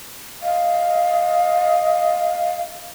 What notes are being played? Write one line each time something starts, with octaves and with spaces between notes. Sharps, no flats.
D#5 F5